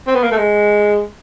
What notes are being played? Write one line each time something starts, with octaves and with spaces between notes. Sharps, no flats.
C4
B3
A#3
A3
G#3